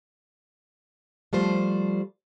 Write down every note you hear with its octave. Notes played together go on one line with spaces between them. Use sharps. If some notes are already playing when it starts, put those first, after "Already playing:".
F3 G3 A3 C5